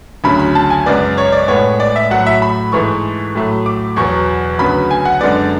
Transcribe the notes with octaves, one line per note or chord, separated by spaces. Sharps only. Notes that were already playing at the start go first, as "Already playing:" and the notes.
D2 C#3 F#3 B5
B5
A5
G#5
F#2 C#3 G#3 B3 D5
C#5
D5
A2 G#3 B3 C#5
D5
E5
A2 F#3 A3 F#5
E5
B5
G#2 E3 A3 C#6
A2 F#3 A3
D6
E2 B2 F#3 B3 C#6
D2 C#3 F#3 B3 B5
G#5
F#5
F#2 D3 G#3 B3 D5